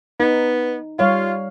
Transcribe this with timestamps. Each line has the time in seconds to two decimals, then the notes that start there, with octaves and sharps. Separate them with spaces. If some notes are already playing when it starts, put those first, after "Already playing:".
0.20 B3 D#4
0.99 G3 F4 C#5 F5